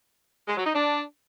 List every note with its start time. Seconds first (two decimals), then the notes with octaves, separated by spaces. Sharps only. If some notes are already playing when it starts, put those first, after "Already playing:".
0.48 G#3
0.57 F#3
0.65 D#4
0.74 D4